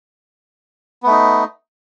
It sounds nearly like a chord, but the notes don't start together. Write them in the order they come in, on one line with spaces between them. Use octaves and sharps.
B3 A3 D#4